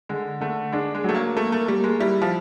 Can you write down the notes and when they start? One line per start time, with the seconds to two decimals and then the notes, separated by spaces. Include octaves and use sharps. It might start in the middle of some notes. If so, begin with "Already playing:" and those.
0.09 D3 G#3
0.41 D3 A3
0.72 G#3 D4
0.95 G#3
1.04 F#3 A3
1.15 A#3
1.36 A3 A#3
1.52 A3
1.68 G3 A#3
1.84 G#3
2.00 G3 E4
2.22 F3